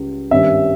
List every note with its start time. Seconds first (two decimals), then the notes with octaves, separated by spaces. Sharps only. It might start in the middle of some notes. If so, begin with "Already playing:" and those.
Already playing: C#2 C#3 G3
0.31 G#1 G2 G3 C#4 E5